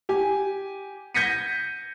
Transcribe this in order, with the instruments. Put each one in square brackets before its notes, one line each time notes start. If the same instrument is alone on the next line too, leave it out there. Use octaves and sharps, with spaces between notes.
[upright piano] G4 G#5
G6 G#6 A#6 B6 C#7 D#7